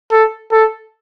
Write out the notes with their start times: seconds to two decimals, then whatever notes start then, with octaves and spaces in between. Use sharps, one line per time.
0.12 A4
0.52 A4